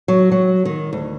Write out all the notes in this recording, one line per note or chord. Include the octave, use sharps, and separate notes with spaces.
F#3
F#3
D#3
D2